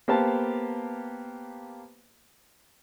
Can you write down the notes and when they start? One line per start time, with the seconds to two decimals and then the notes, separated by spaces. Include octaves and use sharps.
0.08 A#3 B3 G4 C5 F5 A5